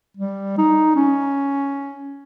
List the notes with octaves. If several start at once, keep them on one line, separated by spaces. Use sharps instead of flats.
G3
D#4
C#4